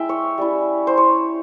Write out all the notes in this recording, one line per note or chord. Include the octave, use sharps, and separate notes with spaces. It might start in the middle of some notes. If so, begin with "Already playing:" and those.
Already playing: G#3 E4 E5 G5
C#5
G3 C#4 E4
C5
C#5